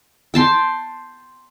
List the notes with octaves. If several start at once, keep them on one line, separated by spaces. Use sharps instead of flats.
G5 A5 C6